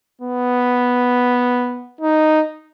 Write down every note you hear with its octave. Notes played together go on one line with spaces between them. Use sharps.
B3
D#4